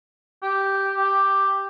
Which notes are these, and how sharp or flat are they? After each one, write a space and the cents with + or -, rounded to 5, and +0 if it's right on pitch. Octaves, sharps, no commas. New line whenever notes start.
G4 -5
G4 +5